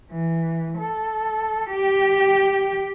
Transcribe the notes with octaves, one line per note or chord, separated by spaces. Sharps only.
E3
A4
G4 G5